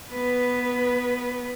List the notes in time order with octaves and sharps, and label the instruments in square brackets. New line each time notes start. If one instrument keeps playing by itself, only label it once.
[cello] B3 B4